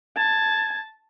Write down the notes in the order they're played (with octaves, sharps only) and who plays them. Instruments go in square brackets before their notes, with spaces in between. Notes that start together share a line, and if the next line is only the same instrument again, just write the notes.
[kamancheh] A5 [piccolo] G#6